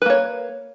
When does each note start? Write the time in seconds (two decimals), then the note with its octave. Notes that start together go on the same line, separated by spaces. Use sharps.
0.02 B4
0.06 A#3
0.10 C#5